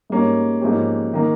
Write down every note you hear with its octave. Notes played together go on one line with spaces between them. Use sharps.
G#2 G3 A#3 C#4
G#2 F3 A#3 C#4 G4
D#3 A#3